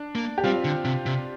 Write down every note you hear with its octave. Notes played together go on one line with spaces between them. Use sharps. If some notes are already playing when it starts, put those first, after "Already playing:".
Already playing: D4
A#3
G4
G3 C4 F4
D3
C3
C3